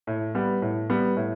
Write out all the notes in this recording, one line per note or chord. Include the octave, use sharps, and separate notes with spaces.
A2
G3 B3
A2
G3 B3
A2